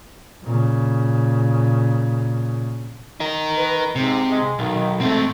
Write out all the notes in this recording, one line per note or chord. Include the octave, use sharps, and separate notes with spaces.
A#2 C#3
D#4 A#4
B4
G#2 C3
G#2 G#3
B1 D#3
G#2 A3 C4